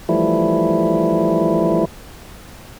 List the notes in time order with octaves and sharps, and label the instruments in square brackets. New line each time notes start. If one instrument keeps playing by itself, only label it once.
[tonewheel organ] E3 F3 G3 A3 E4